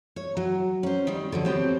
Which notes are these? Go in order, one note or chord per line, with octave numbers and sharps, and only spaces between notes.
C#5
F#3
C#4 C5
D#3 G3
D3 F3 F#3
B3 C4 G4 C5 C#5